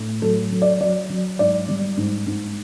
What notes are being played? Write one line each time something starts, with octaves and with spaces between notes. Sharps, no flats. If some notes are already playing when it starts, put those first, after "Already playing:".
Already playing: A2
F#3 A4
F#3
D5
F#3 D5
F#3
G#2 D5
G3
G#2
G#2